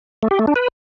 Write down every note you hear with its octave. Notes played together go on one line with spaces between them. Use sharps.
A3
G4
A3
D4
B4